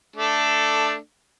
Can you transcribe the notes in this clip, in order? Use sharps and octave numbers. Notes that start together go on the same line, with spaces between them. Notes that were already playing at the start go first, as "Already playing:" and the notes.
A3 D4 A4